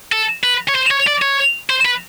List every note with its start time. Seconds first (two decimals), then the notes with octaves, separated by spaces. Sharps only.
0.12 A4
0.44 B4
0.68 C#5
0.75 C5
0.91 C#5
1.07 D5
1.22 C#5
1.70 C5
1.85 B4